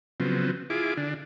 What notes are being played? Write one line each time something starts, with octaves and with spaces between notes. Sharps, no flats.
C#3 F3 F#3 B3 C4
E4 F4 G#4 D6
D3 D4